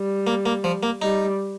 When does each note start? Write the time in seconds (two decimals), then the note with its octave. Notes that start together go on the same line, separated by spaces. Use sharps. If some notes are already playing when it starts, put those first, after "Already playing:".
Already playing: G3
0.27 A#3
0.46 A#3
0.64 F3
0.83 A#3
1.02 G3 D#4